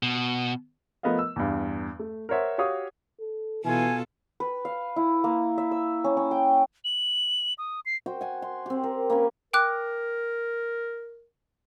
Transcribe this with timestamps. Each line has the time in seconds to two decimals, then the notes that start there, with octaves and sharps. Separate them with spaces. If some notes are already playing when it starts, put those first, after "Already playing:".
0.03 B2
1.03 F3 A3 B3 A#4 D#5 F5
1.19 E6
1.36 E2 G2
1.99 A3
2.29 A#4 C5 C#5 E5 F#5
2.58 F#4 G4 C#5 F5 D#6
3.20 A4
3.64 B2 E3 F4 A4 G#5
4.40 B4
4.65 F5
4.96 E4
5.24 A#3
5.58 E5
5.71 E6
6.04 C#4
6.17 C#4
6.31 G5
6.84 F#7
7.58 D#6
7.86 C7
8.06 F#4 C5 G5
8.21 F#5 G#5
8.42 C6
8.66 C4 G4
8.84 A#4
9.10 A#3 C#4 B4
9.53 A#4 G5 D6 F#6